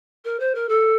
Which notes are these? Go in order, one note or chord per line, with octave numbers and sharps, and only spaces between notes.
A#4
C5
A#4
A4